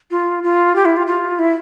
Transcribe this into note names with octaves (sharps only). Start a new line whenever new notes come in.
F4
F4
G4
E4
F4
F4
E4